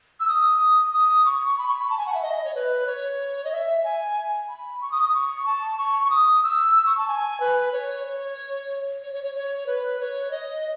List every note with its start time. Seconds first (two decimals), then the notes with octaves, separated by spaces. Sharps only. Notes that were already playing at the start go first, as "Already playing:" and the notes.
0.20 E6
0.28 D#6
0.93 D#6
1.25 C#6
1.58 B5
1.68 C#6
1.79 B5
1.90 A5
1.98 G#5
2.07 F#5
2.14 E5
2.23 D#5
2.34 D#5
2.45 C#5
2.55 B4
2.87 C#5
3.44 D#5
3.52 E5
3.84 G#5
4.49 B5
4.81 C#6
4.92 D#6
5.03 D#6
5.14 C#6
5.46 A5
5.78 C#6
6.05 C#6
6.10 D#6
6.43 E6
6.76 E6
6.86 C#6
6.98 A5
7.08 G#5
7.40 B4
7.73 C#5
8.05 C#5
9.03 C#5
9.13 C#5
9.24 C#5
9.35 C#5
9.67 B4
10.00 C#5
10.31 D#5